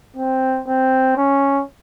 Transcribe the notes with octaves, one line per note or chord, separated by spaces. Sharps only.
C4
C4
C#4